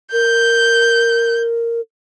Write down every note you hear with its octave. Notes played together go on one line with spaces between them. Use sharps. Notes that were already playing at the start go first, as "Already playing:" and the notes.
A#4 G6